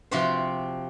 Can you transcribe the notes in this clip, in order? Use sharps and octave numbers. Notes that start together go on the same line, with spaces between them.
C3 F3 C4 F#4 G4 C5